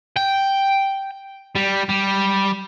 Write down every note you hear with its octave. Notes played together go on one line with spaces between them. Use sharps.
G5
G3
G3